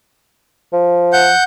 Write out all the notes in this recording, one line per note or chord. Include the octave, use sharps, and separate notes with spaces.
F3
F#5 G6